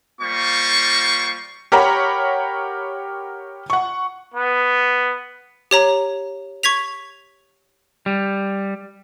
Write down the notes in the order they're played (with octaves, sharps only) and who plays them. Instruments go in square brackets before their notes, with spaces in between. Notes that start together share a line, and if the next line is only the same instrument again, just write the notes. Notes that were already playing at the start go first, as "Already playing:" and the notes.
[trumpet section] G3 A#3 F4 C5 C#6
[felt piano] G4 A#4 C#5 F#5 A#5 B5
F#5 C#6
[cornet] B3
[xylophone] G4 C#5 A#5
C#6 G#6 B6 F7
[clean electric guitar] G3